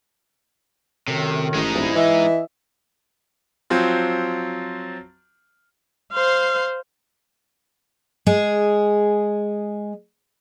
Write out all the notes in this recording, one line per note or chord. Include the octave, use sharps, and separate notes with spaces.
F#2 A2 C3 D#3
A1 G#3 D#4
D#1 C2 E3 E4
E3 D#5 E5
F3 F#3 C4 F4
C5 F5
G#3 G#4